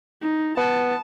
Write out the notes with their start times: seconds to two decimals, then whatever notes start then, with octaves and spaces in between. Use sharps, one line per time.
0.22 D#4
0.58 B3 A5